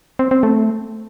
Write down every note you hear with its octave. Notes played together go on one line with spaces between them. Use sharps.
C4
C4
A3